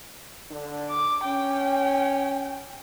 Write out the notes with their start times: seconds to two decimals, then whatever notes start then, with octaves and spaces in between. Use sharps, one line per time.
0.52 D3 D4
0.90 D6
1.26 C#4 G5